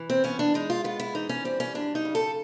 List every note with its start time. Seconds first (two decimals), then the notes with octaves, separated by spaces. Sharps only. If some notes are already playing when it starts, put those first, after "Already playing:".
Already playing: E3
0.10 C4
0.24 B3 C#4
0.39 D4
0.54 G#3 D#4
0.70 F4
0.84 B3 F4
1.00 E4
1.15 E3 D#4
1.29 C#4
1.44 G3 C4
1.60 C#4
1.75 F#2 D4
1.95 D#4
2.05 C#3
2.15 A4